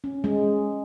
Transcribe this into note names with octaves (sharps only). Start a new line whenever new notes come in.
C#4
G#3